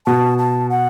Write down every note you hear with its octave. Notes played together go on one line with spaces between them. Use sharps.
B2 A5
A5
F#5